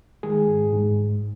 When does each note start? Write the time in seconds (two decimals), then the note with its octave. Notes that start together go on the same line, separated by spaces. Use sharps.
0.23 D#3 G#3 G#4
0.48 G#2
0.73 G#2